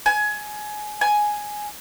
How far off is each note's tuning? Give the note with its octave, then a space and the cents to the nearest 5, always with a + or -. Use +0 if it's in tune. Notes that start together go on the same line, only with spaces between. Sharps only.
G#5 +20
G#5 +5